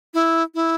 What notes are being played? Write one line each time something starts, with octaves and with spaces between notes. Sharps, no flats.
E4
E4